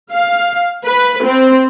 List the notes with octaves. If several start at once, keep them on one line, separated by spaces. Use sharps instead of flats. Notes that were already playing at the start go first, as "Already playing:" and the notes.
F5
B4
C4